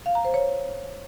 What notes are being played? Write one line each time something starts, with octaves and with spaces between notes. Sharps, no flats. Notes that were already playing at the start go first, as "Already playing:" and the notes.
F5
A#5
C5
C#5